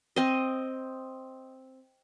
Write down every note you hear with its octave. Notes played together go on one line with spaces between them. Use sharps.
C4 D#5